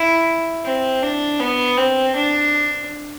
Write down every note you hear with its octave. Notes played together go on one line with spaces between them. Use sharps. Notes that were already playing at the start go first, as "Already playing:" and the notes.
Already playing: E4
C4
D4
B3
C4
D4